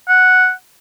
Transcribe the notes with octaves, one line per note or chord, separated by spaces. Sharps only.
F#5